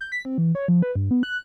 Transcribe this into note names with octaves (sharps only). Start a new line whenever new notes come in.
G6
B6
C4
E3
C#5
F3
B4
G2
B3
F#6